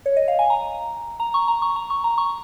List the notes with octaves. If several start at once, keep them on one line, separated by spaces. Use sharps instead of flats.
C#5
D#5
F5
G#5
A#5
A#5
C#6
A#5
C#6
A#5
C#6
A#5
C#6